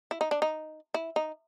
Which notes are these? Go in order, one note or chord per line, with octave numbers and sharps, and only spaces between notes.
E4
D#4
D4
D#4
E4
D#4